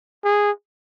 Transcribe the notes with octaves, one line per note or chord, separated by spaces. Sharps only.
G#4